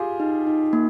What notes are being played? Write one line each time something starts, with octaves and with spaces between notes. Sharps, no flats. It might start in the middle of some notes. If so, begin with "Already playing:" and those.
Already playing: F4 G4 G#4
D#4
D#4
A#3